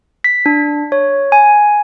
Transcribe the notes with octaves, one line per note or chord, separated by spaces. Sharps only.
B6
D4
C#5
G#5